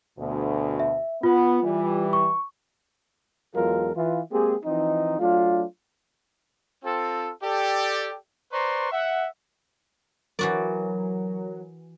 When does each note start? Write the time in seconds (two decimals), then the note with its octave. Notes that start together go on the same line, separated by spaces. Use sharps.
0.19 D2 B2
0.80 E5
1.23 B3 F4
1.64 E3 G3
2.13 C#6
3.55 E2 F#3 G#3 F4 A4 A#4
3.95 E3 F4
4.32 G#3 A#3 C4 G4 G#4
4.65 E3 F3 C4 D#4
5.19 F#3 A3 D4 F4
6.84 C4 F4 A4
7.43 G4 A4 D5
8.52 B4 C5 D5 A#5 C6 C#6
8.92 E5 F#5
10.39 E3 F#3 F#4 A#4 D5